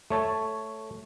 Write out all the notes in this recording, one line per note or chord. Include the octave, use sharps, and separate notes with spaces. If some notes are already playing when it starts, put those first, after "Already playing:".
A3 C#5 A5